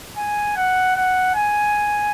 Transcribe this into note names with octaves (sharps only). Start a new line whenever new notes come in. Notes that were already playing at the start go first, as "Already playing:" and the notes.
G#5
F#5
F#5
G#5